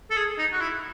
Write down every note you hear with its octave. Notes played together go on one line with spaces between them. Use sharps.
A4
G#4
D#4
F#4
E4